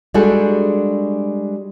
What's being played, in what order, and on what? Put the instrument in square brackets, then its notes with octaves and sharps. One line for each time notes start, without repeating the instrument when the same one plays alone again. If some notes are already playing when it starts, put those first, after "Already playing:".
[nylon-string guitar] G3 G#3 D4 F#4 G#4 A4